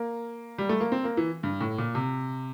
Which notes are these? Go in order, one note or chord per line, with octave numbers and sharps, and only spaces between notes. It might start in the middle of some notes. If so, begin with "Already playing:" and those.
Already playing: A#3
G3
A3
A#3
C4
A#3
E3
G2
A2
A#2
C3